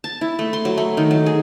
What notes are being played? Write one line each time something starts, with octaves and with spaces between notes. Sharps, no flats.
A5
E4
A3
C6
F#3
A3
D#3
F#3
G#4